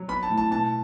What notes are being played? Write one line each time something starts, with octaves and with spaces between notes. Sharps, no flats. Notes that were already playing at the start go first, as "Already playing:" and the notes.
Already playing: F#3
B3 B5
A5
A2
A5
B2 A5